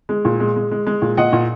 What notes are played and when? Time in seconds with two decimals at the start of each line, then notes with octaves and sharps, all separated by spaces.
0.09 G#3
0.25 A#2
0.40 G#3
0.56 G#3
0.71 G#3
0.87 G#3
1.02 A#2
1.17 A#2 D#5 F#5
1.33 A#2